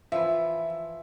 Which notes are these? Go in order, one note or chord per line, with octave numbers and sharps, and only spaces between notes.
E3 F3 E5